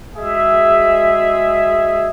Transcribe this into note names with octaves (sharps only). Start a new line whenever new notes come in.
G#3 F#4 G#4 E5